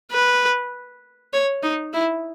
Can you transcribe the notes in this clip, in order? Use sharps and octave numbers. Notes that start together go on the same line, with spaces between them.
B4
C#5
D#4
E4